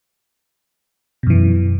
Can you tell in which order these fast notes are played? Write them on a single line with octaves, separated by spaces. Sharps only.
B2 F#2 E3